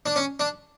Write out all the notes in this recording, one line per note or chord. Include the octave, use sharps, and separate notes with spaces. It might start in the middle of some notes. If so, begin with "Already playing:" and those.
D4
C#4
D4